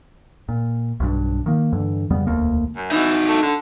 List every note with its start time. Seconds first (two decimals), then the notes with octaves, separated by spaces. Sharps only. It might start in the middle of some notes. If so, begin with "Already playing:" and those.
0.49 A#2
1.00 B1 G2
1.46 D#3 A#3
1.73 G2 D3 E3
2.10 F2 C#3 G3 B3
2.27 E1 D2 A#3
2.76 F#2
2.91 E3 D#4 F#4
3.29 A3
3.42 D3